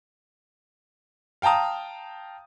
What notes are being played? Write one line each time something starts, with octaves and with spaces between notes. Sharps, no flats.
F5 G5 A5 A#5 D#6